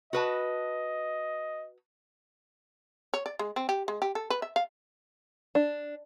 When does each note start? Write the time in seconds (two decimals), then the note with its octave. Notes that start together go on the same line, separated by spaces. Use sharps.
0.13 F#4 B4 D#5 A5
3.14 C#5
3.26 D5
3.39 G#3
3.56 C4
3.69 G4
3.88 G#3
4.02 G4
4.15 A4
4.30 B4
4.42 E5
4.56 F5
5.55 D4